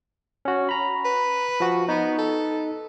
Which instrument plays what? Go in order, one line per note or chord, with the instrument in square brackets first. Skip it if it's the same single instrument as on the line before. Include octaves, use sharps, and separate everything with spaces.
[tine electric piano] C#4 F#4
A#5 B5
[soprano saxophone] B4
[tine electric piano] F3 F#4
[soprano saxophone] B3 [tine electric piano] D#4
[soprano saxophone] A4